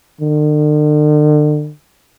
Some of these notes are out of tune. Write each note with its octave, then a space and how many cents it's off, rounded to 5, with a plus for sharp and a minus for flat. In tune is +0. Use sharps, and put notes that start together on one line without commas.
D3 +40